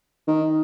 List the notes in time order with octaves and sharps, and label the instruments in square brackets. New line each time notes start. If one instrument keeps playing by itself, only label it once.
[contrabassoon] D#3